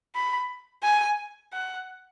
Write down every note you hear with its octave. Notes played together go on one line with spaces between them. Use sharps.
B5
G#5
F#5